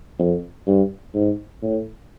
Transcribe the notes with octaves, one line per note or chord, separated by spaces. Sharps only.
F2
G2
G#2
A2